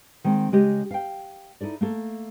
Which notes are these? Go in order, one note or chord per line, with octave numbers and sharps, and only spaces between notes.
D#3 G#3 C4
C#3 G#3 G4 D#5
F5 G5
D#4 E4 A4 D5
A3 A#3 A4